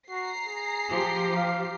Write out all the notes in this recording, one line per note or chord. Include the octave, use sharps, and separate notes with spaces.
F#4 A#5 C7
G#4
F3 G4
F5